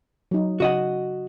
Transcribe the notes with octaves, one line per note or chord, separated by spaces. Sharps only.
F#3 D#4
C#3 F#4 D#5 F#5